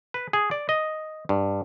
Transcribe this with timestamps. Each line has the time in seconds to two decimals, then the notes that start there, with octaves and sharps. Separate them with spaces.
0.14 B4
0.33 G#4
0.51 D5
0.69 D#5
1.29 G2